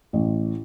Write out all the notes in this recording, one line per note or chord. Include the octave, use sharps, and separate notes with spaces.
A1